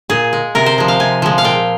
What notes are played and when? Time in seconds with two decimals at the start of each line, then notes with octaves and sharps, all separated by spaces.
0.10 A#2 G#4
0.33 G#3
0.55 C3 A#4
0.66 C5
0.78 F3 G#3
0.88 F5
1.00 C3 G#5
1.22 F3 G#3
1.38 F5
1.44 A#2 G5